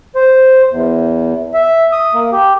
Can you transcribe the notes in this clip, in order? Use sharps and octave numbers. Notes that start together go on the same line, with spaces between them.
C5
E2
E5
D#6
A#3
G4